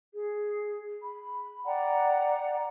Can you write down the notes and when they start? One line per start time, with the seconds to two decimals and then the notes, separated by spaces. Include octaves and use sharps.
0.15 G#4
1.02 B5
1.66 D5 F#5 G5 A#5